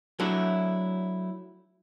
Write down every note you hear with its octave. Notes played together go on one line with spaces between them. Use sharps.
F#3 A3 D4 E4